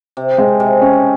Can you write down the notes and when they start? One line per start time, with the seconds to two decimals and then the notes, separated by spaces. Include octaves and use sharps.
0.17 C3
0.38 G#3
0.60 C3
0.81 C#4